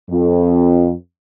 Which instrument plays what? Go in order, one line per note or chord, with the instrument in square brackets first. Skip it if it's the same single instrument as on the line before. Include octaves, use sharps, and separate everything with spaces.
[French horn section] F2